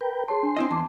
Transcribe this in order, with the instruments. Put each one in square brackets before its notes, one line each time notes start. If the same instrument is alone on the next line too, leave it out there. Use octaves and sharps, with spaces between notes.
[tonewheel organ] A#4 B4 G5
[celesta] G#4 C#5 A5 [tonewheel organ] C6
[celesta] D4 G#5
[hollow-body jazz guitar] C4 E4 D#5
[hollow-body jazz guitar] E2 [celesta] A5 D6